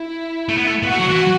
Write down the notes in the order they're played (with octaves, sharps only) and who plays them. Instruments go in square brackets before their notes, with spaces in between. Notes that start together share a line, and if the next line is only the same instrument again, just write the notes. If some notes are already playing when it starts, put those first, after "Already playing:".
Already playing: [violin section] E4
[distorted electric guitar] A3
B3
A3
[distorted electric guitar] B3 [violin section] F#4
[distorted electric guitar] A3
F#3
E3